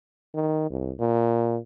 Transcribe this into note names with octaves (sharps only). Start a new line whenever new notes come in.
D#3
C2
A#2